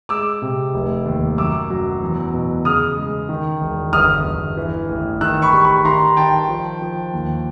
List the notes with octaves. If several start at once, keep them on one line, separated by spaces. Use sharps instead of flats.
G#3 D6 E6
C3
F1
D#2
F#2 D6 E6
F#3
E2
B2
C#3 D#6 F6
G#3
D#3
E1
G1 D#6 F6
G1
E3
A1
D#3 E6 F#6
B5 C#6
G3
B5 C#6
D#3 A#5 C6
D#3 G5 A5
F3
F3
D#2